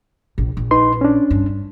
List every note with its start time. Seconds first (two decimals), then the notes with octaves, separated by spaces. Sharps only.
0.38 A#1
0.57 A#1
0.71 D#4 B4 C6
1.01 C#4 D4
1.31 G2